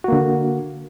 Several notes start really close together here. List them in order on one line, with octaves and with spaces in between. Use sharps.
F#4 A#3 D3